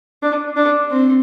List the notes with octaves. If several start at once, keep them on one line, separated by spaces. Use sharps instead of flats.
D4
D4
C4